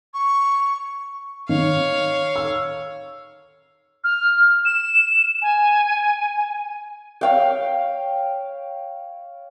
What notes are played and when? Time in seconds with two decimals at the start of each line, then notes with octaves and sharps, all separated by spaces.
0.14 C#6
1.49 D#3 C#5 F5
2.36 E6
4.04 F6
4.65 E7
5.42 G#5
7.21 C#5 F5 G5